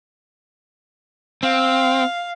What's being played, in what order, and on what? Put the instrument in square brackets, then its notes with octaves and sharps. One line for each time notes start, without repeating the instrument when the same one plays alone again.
[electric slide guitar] C4 [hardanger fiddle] F5